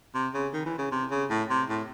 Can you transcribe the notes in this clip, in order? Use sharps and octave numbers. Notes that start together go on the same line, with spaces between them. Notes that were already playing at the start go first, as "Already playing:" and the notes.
C3
C#3
D#3
E3
C#3
C3
C#3
A2
C3
A2